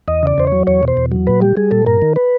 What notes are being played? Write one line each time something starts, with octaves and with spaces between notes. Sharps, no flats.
E2 D#5
C#3 D5
E2 C5
F#3 C#5
E2 C#5
B2 C5
E2
F#3
A#2 B4
G3 G4
G3 G#4
A#2 A4
G2 A#4
D#3
B4